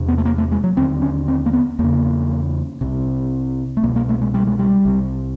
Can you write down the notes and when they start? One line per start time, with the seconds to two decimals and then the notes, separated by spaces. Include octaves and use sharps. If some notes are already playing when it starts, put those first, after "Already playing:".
Already playing: E2 C3
0.08 B3
0.18 A3
0.25 A#3
0.38 A3
0.52 G#3
0.64 F#3
0.77 D#2 D3 C4
1.02 C#4
1.28 C4
1.46 A#3
1.53 B3
1.79 E2 C#3 A#3
2.81 C2 C3
3.77 A3
3.83 C2 B2 A#3
3.96 A#3
4.09 A3
4.22 G#3
4.34 G3
4.47 G#3
4.59 G3
4.85 C2 C3